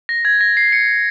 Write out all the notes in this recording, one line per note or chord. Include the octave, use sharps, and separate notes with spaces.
A#6
G#6
A#6
C7
C#7